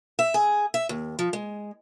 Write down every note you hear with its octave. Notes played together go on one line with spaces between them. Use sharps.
E5
G#4
E5
D#2
F3
G#3